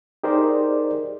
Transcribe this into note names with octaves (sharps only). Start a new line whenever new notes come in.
D#4 G4 G#4 A#4 C5 D5